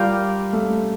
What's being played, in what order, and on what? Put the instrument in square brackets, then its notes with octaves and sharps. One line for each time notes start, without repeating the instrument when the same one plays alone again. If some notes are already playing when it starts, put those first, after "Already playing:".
Already playing: [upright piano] G3 [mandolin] F4 A#4 D5 G5
[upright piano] A3